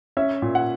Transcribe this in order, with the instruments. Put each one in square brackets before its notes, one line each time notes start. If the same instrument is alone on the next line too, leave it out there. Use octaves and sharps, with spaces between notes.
[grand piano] C#4 E5
A#2
F#5